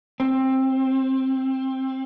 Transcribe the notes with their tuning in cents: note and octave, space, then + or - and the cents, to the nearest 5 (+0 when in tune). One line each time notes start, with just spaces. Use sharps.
C4 +15